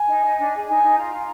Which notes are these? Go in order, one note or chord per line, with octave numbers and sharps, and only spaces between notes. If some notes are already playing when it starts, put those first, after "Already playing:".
Already playing: G#5
D#4
D#4
D4
G#4
D#4 G#5
D#4
F4 A#5
F4